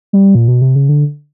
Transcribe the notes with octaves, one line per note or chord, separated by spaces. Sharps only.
G3
A#2
B2
C3
C#3
D3